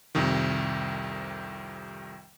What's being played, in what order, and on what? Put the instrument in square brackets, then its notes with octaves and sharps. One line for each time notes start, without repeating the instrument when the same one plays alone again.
[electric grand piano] C2 F2 C3 D#3